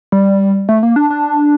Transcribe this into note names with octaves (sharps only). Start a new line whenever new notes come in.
G3
A3
A#3
D4
D4